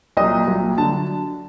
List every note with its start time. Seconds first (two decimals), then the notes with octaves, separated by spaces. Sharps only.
0.17 C2 A#2 F#3 D#5
0.47 C2 A#2 F#3
0.78 D3 F#3 A5